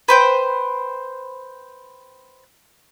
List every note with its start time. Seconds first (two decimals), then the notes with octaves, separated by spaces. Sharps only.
0.08 B4 C5 G5